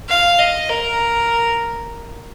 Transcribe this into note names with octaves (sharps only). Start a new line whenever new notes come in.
F5
D#5
A#4